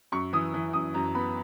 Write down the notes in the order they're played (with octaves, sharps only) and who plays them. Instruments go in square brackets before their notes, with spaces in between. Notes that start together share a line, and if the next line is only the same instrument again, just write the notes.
[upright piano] F#2 C#6
E3 D#6
E3
F#2 D#6
F#2 A#5
B3 B5